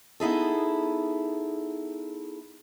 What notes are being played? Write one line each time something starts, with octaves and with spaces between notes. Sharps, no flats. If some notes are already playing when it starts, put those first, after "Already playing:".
B3 D#4 E4 G#4 A4